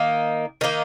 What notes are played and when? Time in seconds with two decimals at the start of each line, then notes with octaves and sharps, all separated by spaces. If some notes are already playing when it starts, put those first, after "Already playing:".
Already playing: D#3 A#3 D#4
0.61 D#3 A#3 D#4